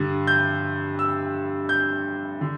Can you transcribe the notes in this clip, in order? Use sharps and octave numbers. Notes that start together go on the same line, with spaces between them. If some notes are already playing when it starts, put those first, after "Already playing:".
Already playing: G2 D3
G6
E6
G6
D3